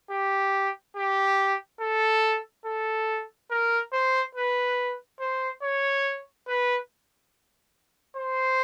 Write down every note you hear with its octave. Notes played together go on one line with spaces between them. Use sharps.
G4
G4
A4
A4
A#4
C5
B4
C5
C#5
B4
C5